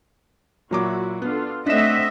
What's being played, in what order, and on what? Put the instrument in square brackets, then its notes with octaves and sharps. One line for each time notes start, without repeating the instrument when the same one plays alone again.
[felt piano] A#2 F#3 D6 [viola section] E4 F#4
[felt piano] B3 [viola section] D4 F4 A4
[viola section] A3 C4 F#5 [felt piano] D4 E7 [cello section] D#5 E5